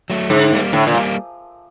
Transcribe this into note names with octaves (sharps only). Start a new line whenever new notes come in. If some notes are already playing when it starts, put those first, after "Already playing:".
F#3 A3
G#2 D3
G3 A#3
A2 D3
A#2
G3 A#3